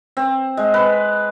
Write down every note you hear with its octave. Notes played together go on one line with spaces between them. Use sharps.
C4
G#3
B4